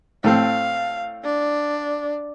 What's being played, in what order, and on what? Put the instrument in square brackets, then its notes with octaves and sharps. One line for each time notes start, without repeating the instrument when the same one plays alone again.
[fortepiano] A2 A3 C4 [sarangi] F5
[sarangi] D4